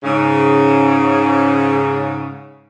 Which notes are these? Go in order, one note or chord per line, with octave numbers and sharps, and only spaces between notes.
G#2 C#3